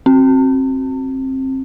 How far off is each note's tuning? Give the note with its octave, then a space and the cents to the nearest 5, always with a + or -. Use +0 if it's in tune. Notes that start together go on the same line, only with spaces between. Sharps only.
C4 +25